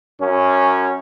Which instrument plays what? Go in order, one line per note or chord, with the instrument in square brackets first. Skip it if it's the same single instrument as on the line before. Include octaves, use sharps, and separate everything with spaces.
[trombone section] F#2 C#4